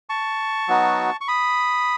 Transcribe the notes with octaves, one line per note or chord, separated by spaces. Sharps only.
A5 C#6
F#3 B3 D#4 F#4
C#6
B5 D#6